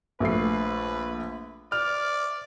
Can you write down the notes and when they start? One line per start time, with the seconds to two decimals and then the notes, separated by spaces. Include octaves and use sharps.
0.20 A#1 A3 B4 C7
1.72 D5 F6